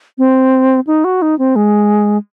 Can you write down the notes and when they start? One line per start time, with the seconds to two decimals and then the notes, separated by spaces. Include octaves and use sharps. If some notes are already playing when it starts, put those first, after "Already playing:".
0.18 C4
0.87 D#4
1.04 F#4
1.22 D#4
1.39 C4
1.56 G#3